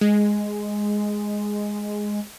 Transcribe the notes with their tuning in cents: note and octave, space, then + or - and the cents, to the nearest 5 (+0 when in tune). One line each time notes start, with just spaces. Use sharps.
G#3 +0